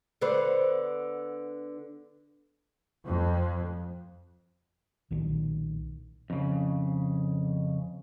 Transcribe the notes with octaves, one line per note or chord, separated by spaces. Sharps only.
D3 B3 C5
F2
B1 A#2 D#3
F2 C#3